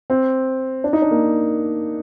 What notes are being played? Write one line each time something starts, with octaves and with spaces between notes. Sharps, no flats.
C4
D4
D#4
D4
A#3